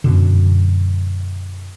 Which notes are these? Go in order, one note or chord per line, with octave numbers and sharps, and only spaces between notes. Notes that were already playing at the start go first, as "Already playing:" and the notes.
F#2 B2 D3